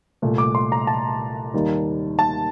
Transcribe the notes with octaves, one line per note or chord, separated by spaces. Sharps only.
C2 A#2 A3
D6
C6
A#5
A5
D#2 D#3 G3 A#3
A5